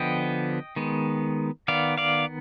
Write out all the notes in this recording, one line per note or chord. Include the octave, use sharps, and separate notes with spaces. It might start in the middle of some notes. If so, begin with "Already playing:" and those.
Already playing: D3 F3 B3 D#5 G5
D#3 G#3 B3
D#3 B3 D5 F5
D5 F5